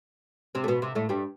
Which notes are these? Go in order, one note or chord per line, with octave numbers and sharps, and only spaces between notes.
C3 C4
A3
B2 B3
C3
A2 A3
G2 G3